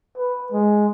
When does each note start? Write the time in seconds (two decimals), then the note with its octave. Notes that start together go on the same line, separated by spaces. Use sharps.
0.17 B4
0.52 G#3